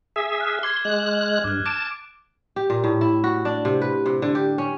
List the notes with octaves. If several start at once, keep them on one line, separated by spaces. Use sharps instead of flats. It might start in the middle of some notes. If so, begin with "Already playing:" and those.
G#4 E5
F6 F#6
C6 D6 G#6
G#3 F#6
G2 D6 F6 F#6
A5 D6 D7 E7
G4
A#2
A2
E4
F#4
D4
C3
B4
C3
D3
G4
C#4